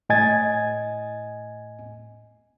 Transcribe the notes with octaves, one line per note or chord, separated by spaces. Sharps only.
A2 D#5 G#5 G#6 A6